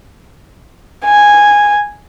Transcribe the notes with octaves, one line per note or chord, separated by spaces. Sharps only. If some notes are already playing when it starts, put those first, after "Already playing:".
G#5